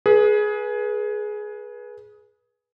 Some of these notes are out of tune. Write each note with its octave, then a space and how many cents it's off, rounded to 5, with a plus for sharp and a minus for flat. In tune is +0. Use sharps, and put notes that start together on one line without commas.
G#4 +15 B4 -25